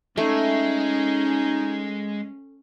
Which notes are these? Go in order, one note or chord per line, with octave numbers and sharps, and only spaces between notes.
G#3 A3 C#4 D#4